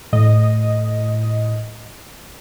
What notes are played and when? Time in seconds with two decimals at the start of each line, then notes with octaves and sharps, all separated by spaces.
0.13 A2 D#5